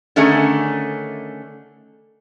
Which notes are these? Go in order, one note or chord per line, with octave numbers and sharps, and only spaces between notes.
D3 D#3 A3 C#4 D4 G#4